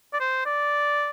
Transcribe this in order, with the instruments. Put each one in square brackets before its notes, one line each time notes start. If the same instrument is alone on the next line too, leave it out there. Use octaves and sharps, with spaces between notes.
[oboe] D5
C5
D5